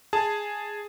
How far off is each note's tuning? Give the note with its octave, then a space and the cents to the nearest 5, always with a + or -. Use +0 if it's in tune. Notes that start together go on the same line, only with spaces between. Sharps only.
G#4 +0 A5 +0